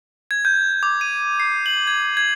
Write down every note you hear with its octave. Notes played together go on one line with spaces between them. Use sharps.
G#6
G6
D6
D#7
C7
F#7
G#6
G#6